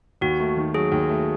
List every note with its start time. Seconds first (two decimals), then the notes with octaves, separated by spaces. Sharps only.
0.21 D#2 F#4
0.40 A3
0.57 D#3
0.75 F#3 G#4
0.92 D#2
1.09 A3